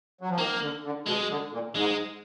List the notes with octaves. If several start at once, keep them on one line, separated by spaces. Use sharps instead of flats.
F#3
F3
D#3 A#3
D3
D3
B2 G#3
D3
A#2
G#2 G#3